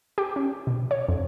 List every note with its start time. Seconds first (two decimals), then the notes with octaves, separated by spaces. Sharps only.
0.18 G4
0.36 C#4
0.67 B2
0.91 C#5
1.09 F2